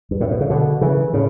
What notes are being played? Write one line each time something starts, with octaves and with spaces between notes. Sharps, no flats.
G2
A2
B2
C#3
B2 D3
C#3 E3
A2 C#3